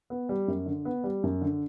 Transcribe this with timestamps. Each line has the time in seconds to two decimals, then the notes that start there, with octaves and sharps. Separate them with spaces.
0.10 B3
0.29 G3
0.48 F#2
0.66 D3
0.85 B3
1.04 G3
1.23 F#2
1.41 D3